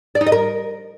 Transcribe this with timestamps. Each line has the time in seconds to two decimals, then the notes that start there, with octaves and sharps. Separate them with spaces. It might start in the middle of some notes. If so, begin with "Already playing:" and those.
0.15 D5
0.21 D#4
0.26 D#5
0.32 A#4